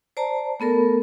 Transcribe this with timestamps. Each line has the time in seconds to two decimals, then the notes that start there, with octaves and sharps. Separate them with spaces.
0.17 C5 D5 A5 A#5
0.60 A3 B3 A4 A#4